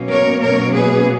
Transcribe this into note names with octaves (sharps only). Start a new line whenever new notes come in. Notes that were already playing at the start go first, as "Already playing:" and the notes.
Already playing: B2 F#3 A#3 C#4
A#4 C#5
A#4 C#5
G#4 B4